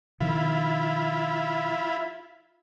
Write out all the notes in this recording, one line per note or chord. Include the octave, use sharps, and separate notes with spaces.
B2 D#3 F3 E4 F4 B5